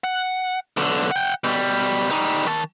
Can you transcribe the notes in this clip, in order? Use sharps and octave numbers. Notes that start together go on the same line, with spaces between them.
F#5
B1 D3
F#5 G5
B2 G3
G3 D#4
D#3 A5